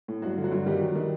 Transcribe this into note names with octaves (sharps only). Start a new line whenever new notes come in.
A2
G2 F#3 F#4
D3
F#3 F#4
G2
D#3 G3 G4
F#3
D#3